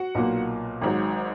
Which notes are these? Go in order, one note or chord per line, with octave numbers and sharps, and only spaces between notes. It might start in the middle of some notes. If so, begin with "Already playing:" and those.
Already playing: F#4 F#5
B1 A#2 F#3 A#3
G#1 G#2 F#3